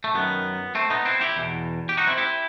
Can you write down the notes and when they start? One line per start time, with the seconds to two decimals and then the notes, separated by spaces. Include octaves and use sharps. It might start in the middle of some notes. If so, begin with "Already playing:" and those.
0.04 A3
0.14 F#2 D#3 B3
0.75 A3 C4
0.90 B3 D#4
1.05 C4 E4
1.21 E4 G4
1.36 E2 B2
1.89 G4
1.97 D#4 F#4
2.07 C4 E4
2.17 E4 G4